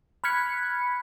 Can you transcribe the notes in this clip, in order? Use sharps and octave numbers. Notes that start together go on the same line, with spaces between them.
B5 F6 F#6 G#6 B6 C#7